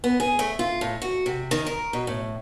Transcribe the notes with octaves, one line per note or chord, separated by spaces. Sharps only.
B3
G#4
A3
F4
A2
F#4
C3
D#3
A#4
B2
A2